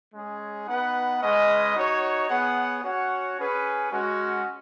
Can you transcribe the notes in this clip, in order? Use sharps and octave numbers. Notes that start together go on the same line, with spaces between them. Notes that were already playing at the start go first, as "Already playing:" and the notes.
G#3 C#4 G#4
B3 D#4 B4 F#5
G#3 C#4 B4 D#5
D#4 F#4 C#5 F#5
B3 G#4 C#5 F#5
C#4 F#4 C#5 F#5
C#4 G#4 B4
G#3 C#4 F#4